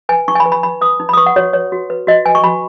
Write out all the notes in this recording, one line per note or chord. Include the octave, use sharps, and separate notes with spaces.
B4 G#5
D#4 C#6
G#5
B5
B4
B5
D#4 B5
B4 D#6
D#4
B5
D#6
B4 C#6
F#5
F#4 C#5
B4 C#5
F#4
B4
F#4 D#5
B4 G#5
C#6
F#4 B5